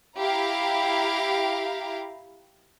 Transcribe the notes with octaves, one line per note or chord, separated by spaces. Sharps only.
E4 G4 F5 A#5